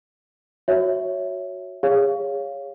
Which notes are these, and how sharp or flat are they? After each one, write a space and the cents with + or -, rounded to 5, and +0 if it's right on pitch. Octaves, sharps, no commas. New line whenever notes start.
F#4 +0 C#5 +0 E5 +0
G#4 -30 C#5 +0 F5 +0